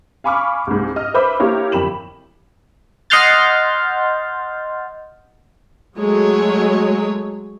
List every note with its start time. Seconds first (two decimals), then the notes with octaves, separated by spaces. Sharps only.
0.24 F5 G#5 B5 C#6 D6 F6
0.67 C2 G#2
0.96 D#5 F6
1.14 B4 C5 E5 B5 D6 E6
1.40 A#3 E4 G4 A#4 C#5
1.72 G1 F2 G5 B5 E7 F#7
3.10 D#5 F#5 C6 F6 G6 A6
5.97 F#3 G#3 A3 G#4 C#5